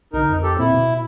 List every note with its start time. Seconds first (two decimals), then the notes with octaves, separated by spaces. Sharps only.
0.13 B1 D3 D#4 A#4
0.29 F2
0.43 G4 A4
0.59 D1 A#2 C4 E4
0.74 B2